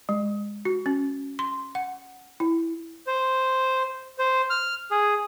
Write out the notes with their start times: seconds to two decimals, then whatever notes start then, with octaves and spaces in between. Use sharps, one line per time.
0.09 G#3
0.65 F#4
0.86 C#4
1.39 C6
1.75 F#5
2.40 E4
3.07 C5
4.19 C5
4.50 F6
4.91 G#4